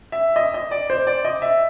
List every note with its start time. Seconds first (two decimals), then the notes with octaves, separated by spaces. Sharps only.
0.12 E5
0.36 D#5
0.54 D#5
0.71 D5
0.90 C5
1.07 D5
1.25 D#5
1.42 E5